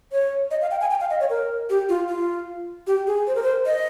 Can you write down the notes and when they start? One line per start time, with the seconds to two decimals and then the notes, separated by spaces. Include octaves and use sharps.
0.12 C#5
0.51 D#5
0.61 F5
0.71 G5
0.81 G#5
0.91 G5
1.00 F5
1.10 D#5
1.20 C#5
1.30 A#4
1.70 G4
1.89 F4
2.09 F4
2.87 G4
3.07 G#4
3.27 C5
3.35 A#4
3.43 C5
3.66 D#5